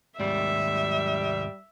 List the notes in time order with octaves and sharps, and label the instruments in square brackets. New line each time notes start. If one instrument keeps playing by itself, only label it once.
[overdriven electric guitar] D#2 G#2 [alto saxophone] G3 [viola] E5